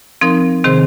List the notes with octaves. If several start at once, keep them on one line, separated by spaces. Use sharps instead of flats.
F3 C4 D#4 A#4
C3 D#3 C4 G#4 C5